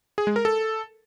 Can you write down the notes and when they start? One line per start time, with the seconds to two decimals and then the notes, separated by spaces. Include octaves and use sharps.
0.18 G#4
0.27 G#3
0.36 A#4
0.45 A4